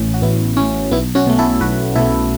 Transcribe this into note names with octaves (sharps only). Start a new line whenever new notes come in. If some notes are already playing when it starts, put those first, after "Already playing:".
Already playing: A1 A2 E3 C#4 E4
F#4
A1 B3 E4
A2 E3 C#4
B1 B3 E4
C#4 F#4
B2 A3
E4 A4
B1 F#4 B4
B2 A3 E4 A4